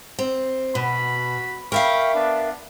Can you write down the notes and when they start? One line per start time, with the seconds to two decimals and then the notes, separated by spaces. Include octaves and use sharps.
0.19 C4
0.75 B2 F#4 B5
1.72 A#4 E5 F5 G5 B5 C#6
2.14 B3 D4